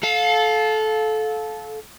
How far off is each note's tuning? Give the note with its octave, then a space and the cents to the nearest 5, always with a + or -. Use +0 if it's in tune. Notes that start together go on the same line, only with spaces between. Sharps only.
A4 -20 F5 +20